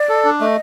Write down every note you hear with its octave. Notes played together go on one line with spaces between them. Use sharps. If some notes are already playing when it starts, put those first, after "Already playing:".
Already playing: D5
A4
D4
A3 D#5